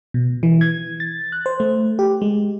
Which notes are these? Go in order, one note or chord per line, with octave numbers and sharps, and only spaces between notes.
B2
E3
G#6
A6
F#6
C5
A3
G4
G#3